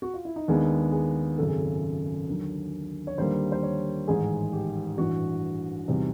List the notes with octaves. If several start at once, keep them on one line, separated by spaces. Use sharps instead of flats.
F#4
F4
E4
D#4
D#2 D#3 G#3 B3 D4
G#4
G#1 F#2 C#3 A4
G#4
A4
D#2 D3 F#3
C#5
D#2 D3 G3 A#3 C5
C5
C#5
A1 G#2 D#3 G#3 G#4
G4
A1 G2 E3 F#4
E2 C3 D#3 G3